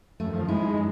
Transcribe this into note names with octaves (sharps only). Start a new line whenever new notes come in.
F#2 A3
D#3 F3
G#3 D#4 E4
F#2